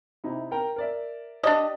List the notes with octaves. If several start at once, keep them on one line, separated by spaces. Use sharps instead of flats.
C3 D#4 E4
A#4 G5 A#5
A#4 D5 E5
D4 G4 D5 D#5